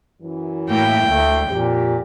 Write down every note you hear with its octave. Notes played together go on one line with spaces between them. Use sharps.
F#2 E3
A2 A#3 E4 G5
D2 A3
F2 A#2 G4